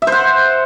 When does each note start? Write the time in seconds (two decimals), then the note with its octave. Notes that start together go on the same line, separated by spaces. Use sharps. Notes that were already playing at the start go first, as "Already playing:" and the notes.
0.02 E5
0.07 C5
0.12 F#5